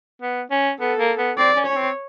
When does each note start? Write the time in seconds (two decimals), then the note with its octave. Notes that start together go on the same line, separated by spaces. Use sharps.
0.22 B3
0.51 C#4
0.80 B3 A4
0.99 A#3
1.19 B3
1.37 C4 D5
1.56 C#4
1.66 C#4 C#5
1.76 C4